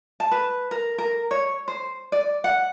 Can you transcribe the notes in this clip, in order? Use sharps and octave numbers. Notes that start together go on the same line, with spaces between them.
A5
B4
A#4
A#4
C#5
C5
D5
F#5